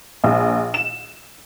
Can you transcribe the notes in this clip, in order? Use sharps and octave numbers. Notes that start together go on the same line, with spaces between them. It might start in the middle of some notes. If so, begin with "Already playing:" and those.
A#1
E7